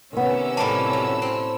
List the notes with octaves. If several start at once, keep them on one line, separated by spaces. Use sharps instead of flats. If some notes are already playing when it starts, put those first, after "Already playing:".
C3 D#3 B3 C#4 E6
A2 G3 A#3 A5 B5
F#3
C4